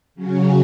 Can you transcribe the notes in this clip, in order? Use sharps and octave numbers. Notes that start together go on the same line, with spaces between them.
C#3 F#3 C#4